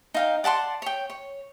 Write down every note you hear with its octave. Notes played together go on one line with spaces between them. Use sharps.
D#4 F5 G5
D5 F#5 A5 C6
C#5 G5
C#5